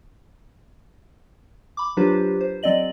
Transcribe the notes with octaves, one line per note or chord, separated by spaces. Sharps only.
B5 D6
F#3 D4 F4 G4 B4 C5
C5
F#3 C4 D5 D#5 F#7